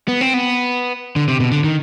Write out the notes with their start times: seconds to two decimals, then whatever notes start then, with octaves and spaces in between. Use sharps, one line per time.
0.08 B3
0.21 C4
0.34 B3
1.16 D3
1.28 C3
1.40 B2
1.52 D3
1.64 D#3